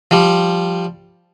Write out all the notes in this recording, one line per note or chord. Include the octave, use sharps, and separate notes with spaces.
F3 G3